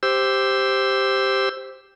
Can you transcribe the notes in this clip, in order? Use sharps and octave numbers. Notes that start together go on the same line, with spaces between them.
G4 C5 E6